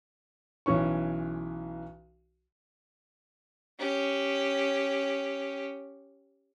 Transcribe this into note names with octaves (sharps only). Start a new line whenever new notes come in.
B1 E3 C#4 C#6
C#4 G4